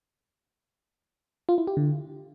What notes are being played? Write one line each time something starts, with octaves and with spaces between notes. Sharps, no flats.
F4
E4
G4
D3